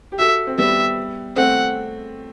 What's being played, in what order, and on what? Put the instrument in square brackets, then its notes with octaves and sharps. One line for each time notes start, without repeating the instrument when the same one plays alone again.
[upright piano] G4
[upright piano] F#4 A4 [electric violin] E5
[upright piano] C4
[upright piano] G3 B3 [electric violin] E5
[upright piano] A3 C4 [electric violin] F#5